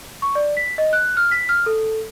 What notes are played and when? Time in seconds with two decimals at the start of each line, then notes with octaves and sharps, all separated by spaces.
0.22 C#6
0.35 D5
0.57 B6
0.78 D#5
0.93 F#6
1.17 F6
1.31 B6
1.49 F6
1.66 A4